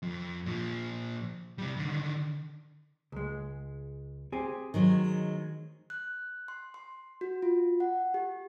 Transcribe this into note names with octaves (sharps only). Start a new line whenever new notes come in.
F2
A#2 F3
C3 G3
D3 D#3
C#2 G#3
C4 G4 G#4
D#3 F#3 G#3
F#6
C6
C6
F#4
F4
F#5
G4